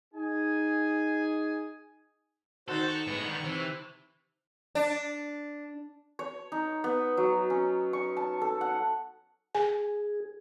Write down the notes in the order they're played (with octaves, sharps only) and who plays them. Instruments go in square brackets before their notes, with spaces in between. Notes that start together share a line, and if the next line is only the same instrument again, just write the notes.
[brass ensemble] D#4 G#4 G#5
[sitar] D#3 D#4 [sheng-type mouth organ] F#4 C5 [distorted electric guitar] A4
[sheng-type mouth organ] C#6
[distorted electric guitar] A2 G#3 [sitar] B3
[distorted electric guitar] D3 D#3
[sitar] C3 [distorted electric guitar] E3
[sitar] D4
[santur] C#5
D#4
B3
F#3
C#4
C#6
A5
A4
F#5
[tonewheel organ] G#4 [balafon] G#5